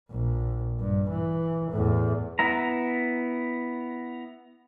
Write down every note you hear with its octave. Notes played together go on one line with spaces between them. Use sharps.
A#1
G2
E3
E2 A2
B3 E4 A#5